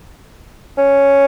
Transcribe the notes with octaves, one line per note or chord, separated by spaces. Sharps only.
C#4